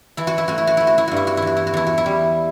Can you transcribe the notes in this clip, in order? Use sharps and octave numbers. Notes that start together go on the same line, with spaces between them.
E3 E4
F#4
E4
A3 F#4
E4
F#4
A3 E4
F#4
E4
G2 F#4
E4
F#4
E4
E2 F#4
E4
F#4
E2 E4
F#4
E4
G3